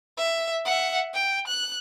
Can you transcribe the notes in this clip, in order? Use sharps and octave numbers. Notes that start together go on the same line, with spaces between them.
E5
E5 F#5
G5
F#6